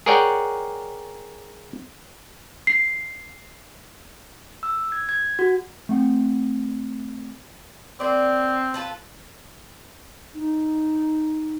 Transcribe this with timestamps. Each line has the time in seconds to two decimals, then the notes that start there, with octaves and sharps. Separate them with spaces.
0.06 G#4 A#4 C#5 D5 F#5 G5
2.67 C7
4.63 E6
4.92 G#6
5.09 G#6
5.39 F#4
5.89 A3 C4 F#5
8.00 A#3 C4 D5
8.74 F4 A4 B4
10.34 D#4